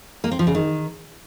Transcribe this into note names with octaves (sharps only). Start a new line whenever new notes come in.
A#3
C4
F3
C#3
D#3